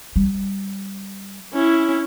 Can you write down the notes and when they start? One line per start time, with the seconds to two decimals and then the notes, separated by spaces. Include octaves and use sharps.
0.16 G3
1.53 C#4 E4